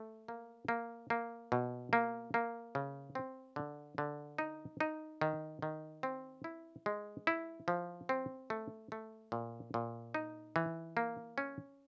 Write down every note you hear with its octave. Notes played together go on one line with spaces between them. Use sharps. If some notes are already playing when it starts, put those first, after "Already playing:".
Already playing: A3
A#3
A#3
A#3
B2
A#3
A#3
C#3
C4
D3
D3
D#4
D#4
D#3
D#3
C4
E4
G#3
E4
F3
C4
A3
A3
A#2
A#2
D#4
E3
A#3
C#4